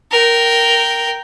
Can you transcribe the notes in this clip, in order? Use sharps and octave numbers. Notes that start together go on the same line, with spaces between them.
A#4 G5